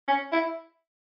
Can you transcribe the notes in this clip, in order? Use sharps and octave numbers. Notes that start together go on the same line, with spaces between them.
C#4
E4